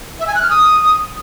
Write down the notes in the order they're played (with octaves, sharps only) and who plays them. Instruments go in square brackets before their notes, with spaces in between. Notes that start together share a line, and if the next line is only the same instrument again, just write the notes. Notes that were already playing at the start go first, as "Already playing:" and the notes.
[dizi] E5
G#5
F#6
F6
D#6